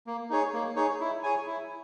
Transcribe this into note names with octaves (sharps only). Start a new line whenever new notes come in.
A#3
D#4 G#4 C#5
A#3
D#4 G#4 C#5
E4
G#4 C#5 G#5
E4